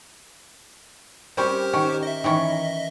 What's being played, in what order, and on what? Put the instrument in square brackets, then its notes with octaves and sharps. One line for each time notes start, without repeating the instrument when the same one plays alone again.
[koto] G3 C4 C#4 [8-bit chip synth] G4 A#4 C5
[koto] D#3 C#4
[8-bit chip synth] D#5 E5
[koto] D#3 E3 C#4